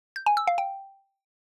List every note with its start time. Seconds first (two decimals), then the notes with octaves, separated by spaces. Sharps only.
0.16 G6
0.26 G#5
0.37 E6
0.47 F5
0.58 G5